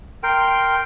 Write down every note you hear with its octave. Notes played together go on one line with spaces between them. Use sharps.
A#4 G5 C6